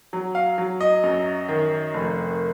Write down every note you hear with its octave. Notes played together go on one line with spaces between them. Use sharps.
F#3
F5
F#3
D#5
F#2
D#3
F1